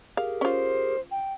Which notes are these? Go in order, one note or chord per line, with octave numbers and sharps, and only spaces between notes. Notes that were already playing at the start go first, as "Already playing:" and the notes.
G4 G#4 A#4 F5
C#4 F4 C5
G5